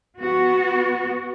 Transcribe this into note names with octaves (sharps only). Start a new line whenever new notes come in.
B3 F#4